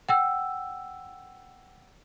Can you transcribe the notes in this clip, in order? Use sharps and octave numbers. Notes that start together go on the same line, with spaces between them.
F#5 G5 E6